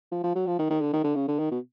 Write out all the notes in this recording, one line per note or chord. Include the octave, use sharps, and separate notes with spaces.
F3
F3
F#3
F3
D#3
D#3
D3
D#3
D3
C#3
D3
D#3
B2